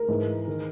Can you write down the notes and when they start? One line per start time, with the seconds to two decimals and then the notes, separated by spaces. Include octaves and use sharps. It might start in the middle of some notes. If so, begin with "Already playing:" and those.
Already playing: A#4
0.08 G#2 E3
0.48 D#3